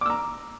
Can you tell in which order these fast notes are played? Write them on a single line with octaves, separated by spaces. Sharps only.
D6 E6 A#5